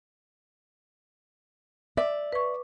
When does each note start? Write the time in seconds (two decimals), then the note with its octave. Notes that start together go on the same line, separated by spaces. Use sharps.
1.97 D5 E5
2.33 B4 C#6